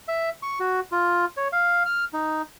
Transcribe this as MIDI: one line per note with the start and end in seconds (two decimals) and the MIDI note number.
0.08 0.30 76
0.43 0.59 85
0.60 0.80 66
0.92 1.25 65
1.37 1.48 73
1.53 1.83 77
1.86 2.04 89
2.13 2.42 63